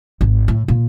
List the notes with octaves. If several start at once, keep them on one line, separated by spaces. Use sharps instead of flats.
G#1
A2
A#2